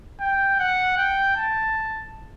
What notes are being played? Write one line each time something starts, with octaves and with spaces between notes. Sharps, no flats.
G5
F#5
G5
A5